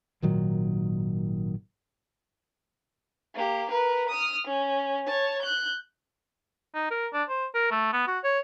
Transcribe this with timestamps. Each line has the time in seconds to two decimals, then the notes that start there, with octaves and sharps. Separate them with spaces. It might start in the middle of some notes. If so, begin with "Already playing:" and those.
0.22 G#1 A#2 D#3 F#3
3.35 A#3 G4
3.70 A#4 B4
4.09 D#6 F6
4.48 C#4
5.07 C#5 A5
5.42 F#6 G6
6.75 D#4
6.91 A#4
7.14 D4
7.29 C5
7.55 A#4
7.71 A3
7.93 B3
8.07 F#4
8.24 C#5